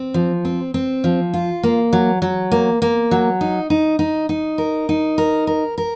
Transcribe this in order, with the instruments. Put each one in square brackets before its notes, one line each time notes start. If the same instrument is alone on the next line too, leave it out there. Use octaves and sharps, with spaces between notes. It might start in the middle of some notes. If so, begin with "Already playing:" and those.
Already playing: [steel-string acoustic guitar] C4
F3
C4
C4
F3
F4
A#3
F#3
F#3
A#3
A#3
F#3
D#4
D#4
D#4
D#4
A#4
D#4
A#4
A#4
A#4